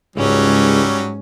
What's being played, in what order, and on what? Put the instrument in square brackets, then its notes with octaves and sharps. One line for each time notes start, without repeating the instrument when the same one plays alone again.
[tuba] C#2 [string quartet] G#2 C#4 [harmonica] F#3 G3